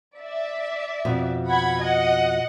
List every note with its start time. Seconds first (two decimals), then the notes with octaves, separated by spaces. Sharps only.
0.16 D5 E5
1.05 F2 B2
1.45 F#5 B5 G#6
1.79 D#5 F#5